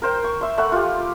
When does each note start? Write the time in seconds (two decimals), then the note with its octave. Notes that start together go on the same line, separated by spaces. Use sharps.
0.02 A#4 C5 G5
0.24 C#6
0.41 E5 C6
0.58 A3 F#5 B5
0.72 F4 G4